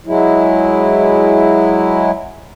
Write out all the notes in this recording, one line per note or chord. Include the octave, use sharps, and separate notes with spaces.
F#3 G#3 E4